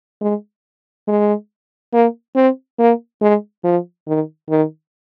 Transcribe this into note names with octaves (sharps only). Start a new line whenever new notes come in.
G#3
G#3
A#3
C4
A#3
G#3
F3
D#3
D#3